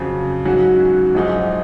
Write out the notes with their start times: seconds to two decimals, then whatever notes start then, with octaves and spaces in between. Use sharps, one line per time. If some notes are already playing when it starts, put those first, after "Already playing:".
Already playing: F2 C#3 F#3
0.45 G#2 F#3 C#4 F#4
1.14 G#1 F#2 F3 G#3 D#4